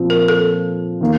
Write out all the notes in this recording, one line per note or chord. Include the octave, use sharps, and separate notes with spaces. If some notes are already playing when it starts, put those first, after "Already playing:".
Already playing: A#2 F3 C4
A#4
A4
D#3 A#3